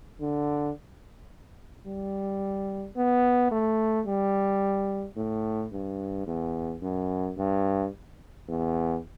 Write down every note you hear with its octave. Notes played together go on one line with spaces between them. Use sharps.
D3
G3
B3
A3
G3
A2
G2
E2
F#2
G2
E2